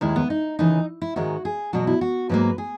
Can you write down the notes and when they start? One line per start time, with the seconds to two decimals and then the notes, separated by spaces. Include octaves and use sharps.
0.01 D#2 D#3 G#3 E4
0.16 B3
0.30 D#4
0.59 D#2 C#3 E3 D#4
1.02 E4
1.16 G#2 D#3 G#3 F#4
1.45 G#4
1.73 E2 B2 F#3 F#4
1.87 E4
2.01 F#4
2.29 G#2 F#3 A#3 B4
2.58 G#4